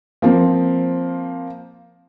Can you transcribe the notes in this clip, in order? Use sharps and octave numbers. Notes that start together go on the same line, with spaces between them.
F3 A#3 C4